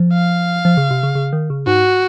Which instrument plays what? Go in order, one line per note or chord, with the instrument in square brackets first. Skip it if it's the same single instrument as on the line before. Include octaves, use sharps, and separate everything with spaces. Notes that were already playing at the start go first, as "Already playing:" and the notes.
Already playing: [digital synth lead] F3
[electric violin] F5
[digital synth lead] F3
C#3
C3
C#3
C#3
D#3
C#3
[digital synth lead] G#2 [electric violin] F#4